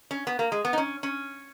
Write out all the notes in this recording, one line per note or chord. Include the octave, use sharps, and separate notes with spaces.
C#4
B3
A#3
G#3
B3
D#4
C#4
C#4